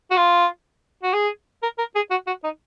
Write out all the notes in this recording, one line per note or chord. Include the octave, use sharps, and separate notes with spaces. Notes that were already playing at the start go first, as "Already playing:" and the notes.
F#4
F4
F#4
G#4
A#4
A#4
G#4
F#4
F#4
D#4